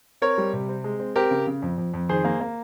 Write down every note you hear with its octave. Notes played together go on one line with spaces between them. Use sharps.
C4 A#4 C#5
G3
C3
C4
G#3
C4
C4 G4 A#4
C#3
C#3
F2
F2
F2
D#3 G#4 C5
A#3
A#3